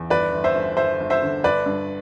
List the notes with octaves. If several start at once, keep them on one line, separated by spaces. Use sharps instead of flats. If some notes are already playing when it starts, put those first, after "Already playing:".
Already playing: E2
G1 B4 D5
G1
C5 E5
G1
G1 C5 E5
G1
C5 E5
D3
G1 B4 D5
G2